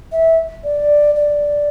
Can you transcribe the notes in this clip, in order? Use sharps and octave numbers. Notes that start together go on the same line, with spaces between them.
E5
D5
D5